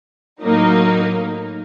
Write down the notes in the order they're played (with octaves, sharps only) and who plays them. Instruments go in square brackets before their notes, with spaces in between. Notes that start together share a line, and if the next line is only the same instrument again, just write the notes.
[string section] A2 F#3 A#3 D#4